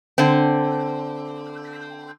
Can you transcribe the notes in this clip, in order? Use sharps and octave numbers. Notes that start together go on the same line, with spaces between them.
D3 C4